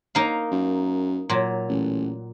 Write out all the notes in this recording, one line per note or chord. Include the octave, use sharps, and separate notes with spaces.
A#3 D#4 F5
F#2
A#2 F#3
A1